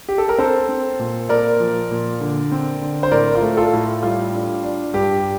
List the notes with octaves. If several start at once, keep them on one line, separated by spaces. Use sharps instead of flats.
G4
A4
A#4
C4 A4 C5
C4
A#2
A#2 A#4 D5
F3
A#2
D3
C4
D3
C5
A2 A#4 D5
F4
A3
F4 A4
A2
G3 F4
D4
D4
G2 G4